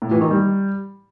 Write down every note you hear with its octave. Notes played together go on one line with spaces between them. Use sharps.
A2
E3
D#3
G3